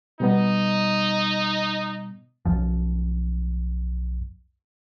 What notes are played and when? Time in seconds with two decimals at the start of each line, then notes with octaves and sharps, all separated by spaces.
0.20 B2 G3 B3 D#4
2.45 B1 F#2 F3